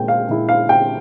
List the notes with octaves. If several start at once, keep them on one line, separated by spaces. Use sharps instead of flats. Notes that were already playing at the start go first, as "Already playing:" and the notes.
Already playing: A#2 G#3 G5
F5
A#2 G#3 E4
F5
G5